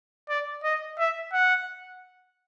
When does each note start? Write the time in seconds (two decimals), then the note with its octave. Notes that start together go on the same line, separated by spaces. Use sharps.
0.29 D5
0.63 D#5
0.99 E5
1.33 F#5